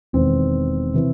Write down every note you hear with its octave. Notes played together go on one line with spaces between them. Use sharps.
E1 E2 D#3 C4
C3 E3